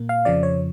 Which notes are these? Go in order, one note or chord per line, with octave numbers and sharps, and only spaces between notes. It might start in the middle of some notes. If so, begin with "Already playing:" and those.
Already playing: A#2 A#3
F5
F2 C#3 F3 D5
C#5